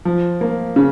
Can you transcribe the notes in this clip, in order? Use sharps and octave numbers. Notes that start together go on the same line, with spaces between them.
F3
A#3
C#3